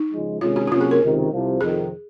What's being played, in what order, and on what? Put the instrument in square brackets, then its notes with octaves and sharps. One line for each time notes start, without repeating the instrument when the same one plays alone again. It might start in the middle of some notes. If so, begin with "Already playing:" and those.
Already playing: [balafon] D#4
[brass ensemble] C#2 C#3 F3 G#3
[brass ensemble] C3 D#3 G#3 C#4 [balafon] F4
[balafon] F#4
F#4
[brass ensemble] C3 F#3 A#3 C#4 [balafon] F4
[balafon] G#4
A#4
[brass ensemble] C#2 C3 D#3
C2 C3 F3
[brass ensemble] F2 C3 D#3 [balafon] G#4